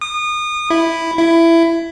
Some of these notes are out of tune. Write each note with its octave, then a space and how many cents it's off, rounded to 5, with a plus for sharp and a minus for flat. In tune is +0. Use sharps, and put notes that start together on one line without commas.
D#6 -30
E4 +0
E4 +15